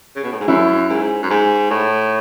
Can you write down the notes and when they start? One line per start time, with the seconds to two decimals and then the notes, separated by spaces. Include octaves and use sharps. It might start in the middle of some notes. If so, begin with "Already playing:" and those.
0.16 C#3
0.24 B2
0.32 A2
0.40 G#2
0.48 F#2 C#4 E4
0.89 G#2
1.23 F#2
1.30 G#2
1.70 A2